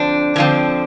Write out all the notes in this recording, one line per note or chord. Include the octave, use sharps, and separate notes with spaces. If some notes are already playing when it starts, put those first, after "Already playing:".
Already playing: D3 F3 C4 D4
D3 F3 C4